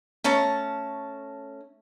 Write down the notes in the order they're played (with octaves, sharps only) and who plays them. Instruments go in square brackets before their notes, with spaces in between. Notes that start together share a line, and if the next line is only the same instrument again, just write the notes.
[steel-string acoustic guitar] A3 C#4 A5 A#5